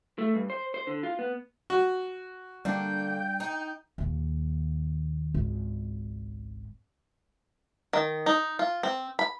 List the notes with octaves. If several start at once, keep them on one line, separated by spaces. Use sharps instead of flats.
A3
G2
C5
C5
D3
F4
B3
F#4
D3 G3 A#3 C4 D4 G5 G6
D#4
D#2 A#2
G#1 C#2
D#3
D#4
F4
C4
B5